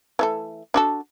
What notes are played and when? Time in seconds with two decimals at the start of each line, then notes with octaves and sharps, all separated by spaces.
0.19 E3 A3 A4
0.74 D4 F#4 A4